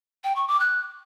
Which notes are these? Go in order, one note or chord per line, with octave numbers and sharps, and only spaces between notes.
G5
C#6
D6
F#6